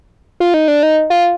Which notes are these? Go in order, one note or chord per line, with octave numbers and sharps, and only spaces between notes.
F4
D#4
D4
D#4
F4